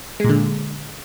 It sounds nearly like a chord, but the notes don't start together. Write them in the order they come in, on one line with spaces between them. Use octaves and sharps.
G#3 A#2 D3